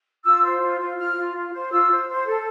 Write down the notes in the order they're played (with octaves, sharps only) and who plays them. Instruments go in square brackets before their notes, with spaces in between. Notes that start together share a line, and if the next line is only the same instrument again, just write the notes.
[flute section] F4 E6
C5
F4
F4
F4 F6
F4
F4
C5
F4 E6
C5
C5
A4